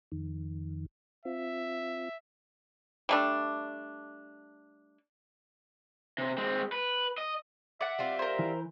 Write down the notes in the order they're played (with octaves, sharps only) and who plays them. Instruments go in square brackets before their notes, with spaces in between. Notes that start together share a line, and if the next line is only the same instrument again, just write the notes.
[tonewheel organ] F2 D#3
[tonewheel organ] C4 F4 [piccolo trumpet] E5
[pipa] G3 A3 D4
[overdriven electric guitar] C3
G#3 C4
B4
D#5
[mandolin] D5 F#5 [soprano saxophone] E5
[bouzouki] G3 C4 F4
[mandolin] A#4 C5
[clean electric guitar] E3